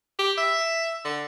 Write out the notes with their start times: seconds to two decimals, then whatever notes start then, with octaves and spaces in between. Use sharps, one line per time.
0.19 G4
0.37 E5
1.05 D3